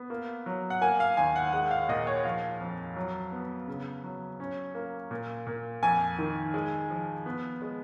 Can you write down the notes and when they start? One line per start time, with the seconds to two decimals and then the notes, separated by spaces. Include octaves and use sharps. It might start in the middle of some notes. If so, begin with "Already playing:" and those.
Already playing: B3
0.10 A#3
0.46 F#3
0.70 F#5
0.81 A#3 G#5
1.00 F5
1.17 D#2 G#5
1.36 F#5
1.53 G#3 F#5
1.71 F5
1.89 A#2 D#5
2.07 C#5
2.24 F3 F5
2.61 F2
2.96 F#3
3.32 B3
3.68 C#3
4.04 F#3
4.40 C#4
4.75 A#3
5.11 A#2
5.47 A#2
5.83 F2 G#5
6.18 D#3
6.54 G#3
6.90 F3
7.26 B3
7.62 G#3